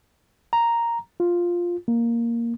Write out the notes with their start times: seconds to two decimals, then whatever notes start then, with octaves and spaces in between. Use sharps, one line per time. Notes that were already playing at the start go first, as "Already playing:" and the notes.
0.53 A#5
1.20 F4
1.88 A#3